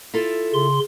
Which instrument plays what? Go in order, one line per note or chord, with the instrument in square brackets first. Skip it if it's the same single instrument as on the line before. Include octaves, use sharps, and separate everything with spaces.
[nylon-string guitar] E4 F4 A4
[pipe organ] C#3 C6